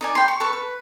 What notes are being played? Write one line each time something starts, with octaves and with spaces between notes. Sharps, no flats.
D#4 D5 G#5
G5 B5 C6
C#6
A4 B4 C#6
B4